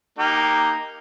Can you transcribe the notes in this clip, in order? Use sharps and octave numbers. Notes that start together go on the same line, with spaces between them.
A#3 D#4 G4